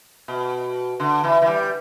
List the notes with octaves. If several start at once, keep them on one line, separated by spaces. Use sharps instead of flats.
B2
D3
E3
E3
G3